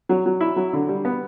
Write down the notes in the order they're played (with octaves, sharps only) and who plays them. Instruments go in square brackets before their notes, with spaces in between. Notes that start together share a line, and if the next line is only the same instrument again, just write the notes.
[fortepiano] F#3
F#3
E4
F#3
D3
G3
B3